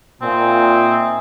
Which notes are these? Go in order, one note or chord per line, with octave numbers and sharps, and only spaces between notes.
A#2 C4 D#4 E5 G#5